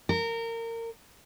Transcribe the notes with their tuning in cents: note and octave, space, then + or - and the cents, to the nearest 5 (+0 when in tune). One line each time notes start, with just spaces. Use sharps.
A#4 -25